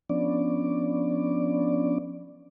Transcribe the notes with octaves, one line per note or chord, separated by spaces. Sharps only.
F3 B3 C#4 D4 D5